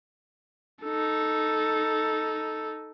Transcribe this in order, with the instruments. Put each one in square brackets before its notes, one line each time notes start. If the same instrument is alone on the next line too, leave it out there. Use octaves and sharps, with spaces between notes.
[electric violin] D#4 A4